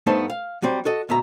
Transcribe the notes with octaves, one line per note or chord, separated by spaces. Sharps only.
G2 A3 B3 D#4 C5 A5
F5
F#3 G3 C4
F#4 A4 D#5
D2 B2 E5 A#5